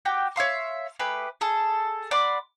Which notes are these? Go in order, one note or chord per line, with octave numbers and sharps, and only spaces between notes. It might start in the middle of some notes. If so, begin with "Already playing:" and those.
F#4 G4 G5
C#5 E5 F5 C6
A3 G4 G#4 B4
G#4 A4
D5 F#5 B5 C6